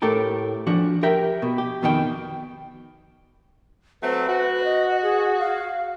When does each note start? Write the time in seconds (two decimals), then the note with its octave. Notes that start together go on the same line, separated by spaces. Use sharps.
0.02 A2 A3 G4 A4 A#4
0.67 F3 D4 F#4
1.03 G4 A#4 E5 G5
1.42 B2
1.58 G4
1.82 F2 B2 D#3 F#4 G5
4.03 F#3 A3 C4 B4
4.28 F#4
4.64 D#5
5.02 G#4
5.39 F5